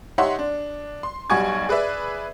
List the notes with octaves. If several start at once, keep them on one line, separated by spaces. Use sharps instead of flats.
D#4 G4 C#5 E5 F#5 C6
D4
C6
B1 G3 F#4 G#5 C#6 G#6
G#4 B4 D5 E5